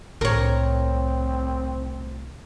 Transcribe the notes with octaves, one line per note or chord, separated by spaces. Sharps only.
C2 A2 C4 A#4 C#5